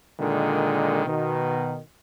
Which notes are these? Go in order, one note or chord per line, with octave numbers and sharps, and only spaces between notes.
A#2 D3 D#3 G#3
B2 D#3